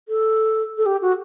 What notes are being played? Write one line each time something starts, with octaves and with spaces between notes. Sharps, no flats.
A4
A4
G4
F#4